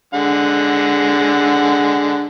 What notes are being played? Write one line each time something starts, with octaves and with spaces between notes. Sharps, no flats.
D3 G#3 F#5